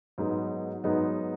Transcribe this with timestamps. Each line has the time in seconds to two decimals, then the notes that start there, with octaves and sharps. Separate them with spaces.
0.18 G#2 F#3 B3 D#4 G#4
0.84 G#2 F#3 B3 D#4 G#4